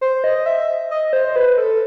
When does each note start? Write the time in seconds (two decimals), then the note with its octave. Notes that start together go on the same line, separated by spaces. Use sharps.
0.01 C5
0.24 D#5
0.46 E5
0.91 D#5
1.13 C5
1.36 B4
1.58 A4